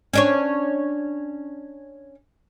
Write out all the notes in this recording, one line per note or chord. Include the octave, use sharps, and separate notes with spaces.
C#4 D4 C#5